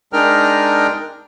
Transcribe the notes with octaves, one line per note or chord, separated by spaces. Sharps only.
G#3 D4 D#4 A#4 G5 F6